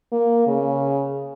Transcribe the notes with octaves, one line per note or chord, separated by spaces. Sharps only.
A#3
C#3